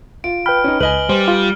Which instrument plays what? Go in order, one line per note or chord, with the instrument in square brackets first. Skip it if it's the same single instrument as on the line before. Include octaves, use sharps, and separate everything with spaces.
[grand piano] F4 [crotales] D7
[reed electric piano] B4 G5 B5 [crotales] F6
[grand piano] C#4 D#4
[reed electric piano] C#2 [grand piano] B4 D#5 G#5 [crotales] F#7 G7
[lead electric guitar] G3 [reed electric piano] C5
[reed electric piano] F4